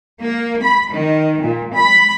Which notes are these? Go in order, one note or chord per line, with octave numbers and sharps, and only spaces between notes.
A#3
B5
D#3
A#2
B5